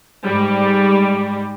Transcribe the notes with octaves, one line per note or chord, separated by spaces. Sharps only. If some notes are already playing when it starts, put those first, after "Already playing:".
G#2 G3